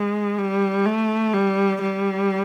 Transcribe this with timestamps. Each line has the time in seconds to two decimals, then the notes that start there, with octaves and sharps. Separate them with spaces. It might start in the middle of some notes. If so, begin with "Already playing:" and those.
Already playing: G#3
0.38 G3
0.86 A3
1.34 G3
1.81 G3